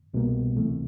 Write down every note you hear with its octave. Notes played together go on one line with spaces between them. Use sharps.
C2 B2 G3 A#3
D2 C3 E3 A3